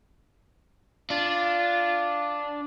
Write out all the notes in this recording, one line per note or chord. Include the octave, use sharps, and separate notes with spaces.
D4 F4